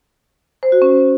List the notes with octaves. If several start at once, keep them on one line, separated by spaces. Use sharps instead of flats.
C5
F#4
C#4